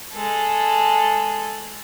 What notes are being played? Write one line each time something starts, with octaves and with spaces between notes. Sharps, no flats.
G#3 A4